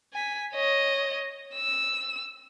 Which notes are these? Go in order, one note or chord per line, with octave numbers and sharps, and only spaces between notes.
G#5 B6
C#5 D#5
E6